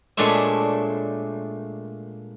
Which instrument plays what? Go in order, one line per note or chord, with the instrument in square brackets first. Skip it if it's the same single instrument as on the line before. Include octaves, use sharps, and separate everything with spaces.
[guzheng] A#2 G#3 A3 D4 C#5 E5